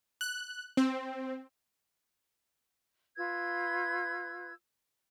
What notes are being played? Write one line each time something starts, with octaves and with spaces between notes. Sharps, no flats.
F#6
C4
F4 B4 E6 G#6